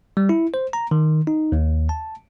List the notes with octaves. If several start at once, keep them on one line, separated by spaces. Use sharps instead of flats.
G3
E4
C5
A#5
D#3
D#4
D#2
A5